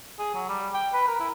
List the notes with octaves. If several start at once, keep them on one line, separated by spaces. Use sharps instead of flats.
G#4
F#3
G3
G5
B4
A#4
E4